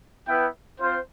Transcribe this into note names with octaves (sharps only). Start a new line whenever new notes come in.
B3 E4 B4 E5 G5
C4 F4 C5